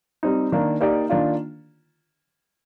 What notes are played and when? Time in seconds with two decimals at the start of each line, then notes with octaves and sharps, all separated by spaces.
0.23 G3 C4 D#4
0.52 D#3 A#3 D4
0.81 A#3 D#4 G4 D5
1.09 D#3 A#3 D4 F4